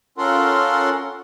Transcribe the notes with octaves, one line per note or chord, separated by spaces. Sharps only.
C#4 F4 A4 A#4 F#5 C6